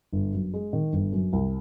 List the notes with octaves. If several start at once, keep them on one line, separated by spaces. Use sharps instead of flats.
G1
F#2
G#3
D#3
G1
F#2
C2